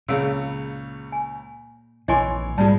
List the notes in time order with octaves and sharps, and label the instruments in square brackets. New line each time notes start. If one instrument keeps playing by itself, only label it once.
[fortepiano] C#2 C#3 [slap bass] A#2 [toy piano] G#4 F5 E6
[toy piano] G#5
[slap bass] A#1 D#3 [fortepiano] E3 C#5 C6 [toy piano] D#5 G#5 D6
[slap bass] G#2 [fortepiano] F3 G#3 [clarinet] G3 [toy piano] A5